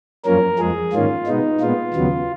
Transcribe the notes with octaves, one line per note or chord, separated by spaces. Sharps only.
F#2 F3 A#3 C#4 A#4
F2 F3 G#3 G#4
G#2 D#3 A#3 C#4 F4
B2 G#3 B3 D#4
A#2 G#3 B3 F4
D#2 C#3 F#3 B3